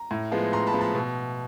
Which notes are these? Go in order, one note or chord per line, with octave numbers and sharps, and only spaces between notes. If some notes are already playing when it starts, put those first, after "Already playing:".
Already playing: A#5
A2
F3 G#3 B3
A2 A#5 C6
A5 B5
F3 G#3 B3
A5 B5
B2